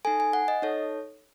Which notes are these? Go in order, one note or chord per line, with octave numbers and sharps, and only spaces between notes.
D#4 A4 G#5
G#5
F#5
D#5
D#4 A4 C#5